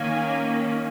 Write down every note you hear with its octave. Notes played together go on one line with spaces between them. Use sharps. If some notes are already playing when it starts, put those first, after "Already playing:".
Already playing: D#3 A#3 C#4 G#5